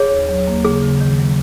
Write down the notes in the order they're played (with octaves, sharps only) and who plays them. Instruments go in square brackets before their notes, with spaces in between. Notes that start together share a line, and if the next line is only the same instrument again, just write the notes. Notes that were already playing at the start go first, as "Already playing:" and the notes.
Already playing: [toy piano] G#4 C#5
[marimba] D#2
F#3
A#3
[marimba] C#3 [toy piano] G#4
[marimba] C#3
D#3
F#3